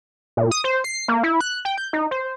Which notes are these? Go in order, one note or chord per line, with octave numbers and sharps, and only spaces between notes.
A#2
D#6
C5
C7
A#3
E4
F#6
G5
G6
D#4
C5